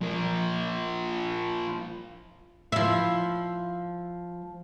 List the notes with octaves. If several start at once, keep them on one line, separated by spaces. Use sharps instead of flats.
F3 A#4
F3 E4